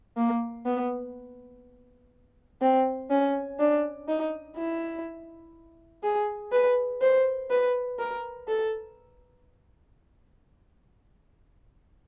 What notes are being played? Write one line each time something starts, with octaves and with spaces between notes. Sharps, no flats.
A#3
B3
C4
C#4
D4
D#4
E4
G#4
B4
C5
B4
A#4
A4